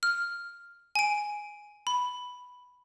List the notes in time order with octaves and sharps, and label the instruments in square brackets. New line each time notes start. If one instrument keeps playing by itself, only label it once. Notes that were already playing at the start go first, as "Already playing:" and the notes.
[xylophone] F6
G#5 D7
B5